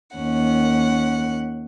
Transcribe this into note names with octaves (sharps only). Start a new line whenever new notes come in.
D#2 C#4 F#5